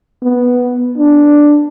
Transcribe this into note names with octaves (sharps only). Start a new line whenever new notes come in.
B3
D4